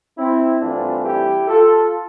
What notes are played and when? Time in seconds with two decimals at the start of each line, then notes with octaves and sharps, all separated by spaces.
0.18 C4 E4
0.62 G2 E3 A3 C4 D4 F4
1.05 E4 G4
1.48 F4 A4